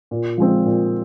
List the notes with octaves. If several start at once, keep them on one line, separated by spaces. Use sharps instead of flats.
A#2
F3 G#3 C4
A#2